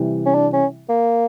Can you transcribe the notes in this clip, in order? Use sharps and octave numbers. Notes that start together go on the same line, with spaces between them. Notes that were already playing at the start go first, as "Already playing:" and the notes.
Already playing: C3 E3 G3
C#4
D4
C#4
A#3